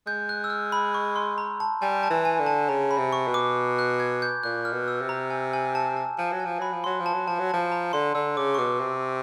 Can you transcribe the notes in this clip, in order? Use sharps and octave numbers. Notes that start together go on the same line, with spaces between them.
G#3 G6
F#6
E6
F6
B5
C#6
C6
A#5
A5
G3 G#5
A5
E3
G#5
D3
A5
C#3 A#5
B5
C3
C#6
B2
D6
F#6
G#6
G6
A#2 F#6
F6
B2
E6
C3
A#5
G#5
G#5
A5
A5
F3 A5
F#3
G#5
F3
F#3 B5
F3
F#3 C6
F3
A5
F#3
F3 A5
F#3
F3 A5
A#5
D3 C6
D3 E6
C#3 D6
C#6
B2 D6
C3